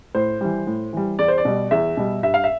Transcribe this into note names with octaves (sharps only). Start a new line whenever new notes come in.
A2 C5
E3 G3
A2
E3 G3
E2 D5
C5
D5
B2 G3
E2 E5
B2 G3
G2 E5
F5
E5